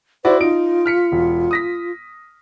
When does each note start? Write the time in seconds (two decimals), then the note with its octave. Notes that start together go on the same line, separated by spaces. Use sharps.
0.25 E4 F#4 C5 D5
0.40 D#4 F4 D7
0.86 F6 B6 C#7
1.12 E1
1.51 D#6 A#6 B6